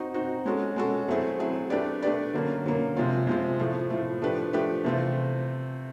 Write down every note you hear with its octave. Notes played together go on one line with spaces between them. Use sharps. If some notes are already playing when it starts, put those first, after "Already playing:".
Already playing: C4 D#4 F#4
C4 D#4 F#4
G#3 C#4 F#4 A4
G#3 C#4 F#4 A4
F#3 A3 C4 E4 G#4
F#3 A3 C4 E4 G#4
A3 D4 G4 B4 D5
A3 D4 G4 B4 D5
D3 F#3 A#3 C#4
D3 F#3 A#3 C#4
C3 F3 G#3 C4 F4
C3 F3 G#3 C4 F4
A2 F3 A3
A2 F3 A3
F3 A3 D4 G4 B4
F3 A3 D4 G4 B4
C3 E3 A3 C4 F4